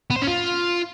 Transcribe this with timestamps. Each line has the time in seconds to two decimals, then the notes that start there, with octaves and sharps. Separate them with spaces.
0.10 B3
0.16 C5
0.22 C#4
0.28 F4